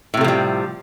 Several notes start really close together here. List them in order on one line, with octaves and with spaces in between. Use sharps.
A2 C3 A3 F3 G3